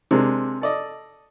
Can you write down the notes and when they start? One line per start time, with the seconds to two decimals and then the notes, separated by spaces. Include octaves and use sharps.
0.11 C3 G#3 D4 A#4
0.62 A4 D5 D#5